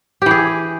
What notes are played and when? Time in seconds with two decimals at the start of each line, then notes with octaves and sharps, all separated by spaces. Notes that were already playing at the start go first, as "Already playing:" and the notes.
0.22 G4
0.26 E3
0.31 G#4